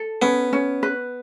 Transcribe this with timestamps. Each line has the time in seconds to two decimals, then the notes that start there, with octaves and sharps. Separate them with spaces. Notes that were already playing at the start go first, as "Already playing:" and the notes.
Already playing: A4
0.22 B3 C#4
0.53 C#4
0.83 B4